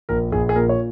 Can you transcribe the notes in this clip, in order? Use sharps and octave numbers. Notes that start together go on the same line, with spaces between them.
A#1 A#4
A#1 G#4
G#4
A#2 A#4
C#5